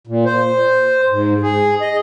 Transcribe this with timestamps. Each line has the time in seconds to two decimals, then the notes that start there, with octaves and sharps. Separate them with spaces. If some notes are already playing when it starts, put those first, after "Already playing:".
0.07 A#2
0.26 C5
1.10 G#2
1.42 G#4
1.82 D#5